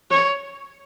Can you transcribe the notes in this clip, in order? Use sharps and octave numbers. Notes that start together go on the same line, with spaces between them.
C#5